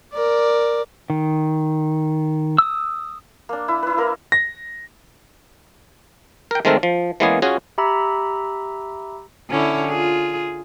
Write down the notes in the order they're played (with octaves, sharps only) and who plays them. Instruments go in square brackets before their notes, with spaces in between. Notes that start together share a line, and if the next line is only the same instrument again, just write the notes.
[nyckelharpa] A#4 D5
[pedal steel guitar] D#3
D#6 E6
[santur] A#3 D4
E4
E4 B4
A#3 A#4
[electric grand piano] A#6
[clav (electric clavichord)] A#4 G5
D#3 G#3 A3 C4 A4 A#4
F3
E3 G#3 A#3 B3 C#4 G#4
C#4 F4 F#4 G#4
[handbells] G4 E5 A#5 B5 E6
[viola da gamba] D3 C#4 E4
F4 G#4